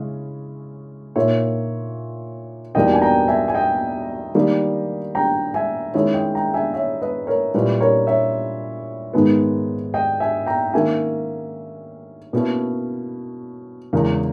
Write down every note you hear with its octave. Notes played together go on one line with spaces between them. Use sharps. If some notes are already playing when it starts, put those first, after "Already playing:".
Already playing: C#3 G#3 C#4 E4
A#2 A#3 D#4 C#5 E5
E2 B2 G3 A#3 D#4 D#5 G5
G#5
G5 A#5
E5 G#5
G#5
D#5 G5
D#3 G3 A#3
G5 A#5
E5 G#5
D#3 G#3 C#4 E4 C#5 E5
D#5 G5
G5 A#5
E5 G#5
C#5 E5
B4 D#5
A#4 C#5
A#2 G3 C#4 E4 B4
A#4 C#5
C#5 E5
G#2 D#3 G#3 B3
D#5 G5
E5 G#5
G5 A#5
D#3 A#3 C#4 E5 G#5
B2 A#3 C#4 E4 B4
E2 C#3 G#3 A#4